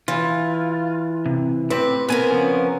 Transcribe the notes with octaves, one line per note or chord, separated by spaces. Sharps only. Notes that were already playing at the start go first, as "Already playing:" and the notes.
E3 F4
C3
A2 C4 G4 B4
B3 C4 A#4 B4 G#5
C#3 F3 C#4